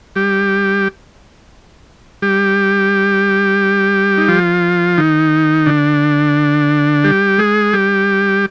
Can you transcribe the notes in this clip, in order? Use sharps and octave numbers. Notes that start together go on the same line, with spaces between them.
G3 G4
G3 G4
D#4
F3 F4
D#3 D#4
D3 D4
G3 G4
G#3 G#4
G3 G4